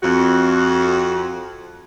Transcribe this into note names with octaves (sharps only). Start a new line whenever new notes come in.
F2 F#4